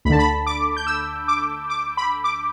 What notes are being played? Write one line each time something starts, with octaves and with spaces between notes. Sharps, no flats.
D2 D3 A5 B5
B5
D6
G6
E6
D6
D6
B5
D6